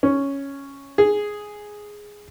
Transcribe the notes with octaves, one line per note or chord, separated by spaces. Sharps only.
C#4
G#4